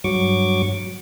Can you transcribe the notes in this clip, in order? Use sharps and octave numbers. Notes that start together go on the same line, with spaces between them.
G2 F#3 C#6 D6